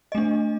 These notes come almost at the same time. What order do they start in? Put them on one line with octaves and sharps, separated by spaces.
D#5 A3 D4